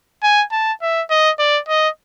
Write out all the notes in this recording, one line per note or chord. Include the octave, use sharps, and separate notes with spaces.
G#5
A5
E5
D#5
D5
D#5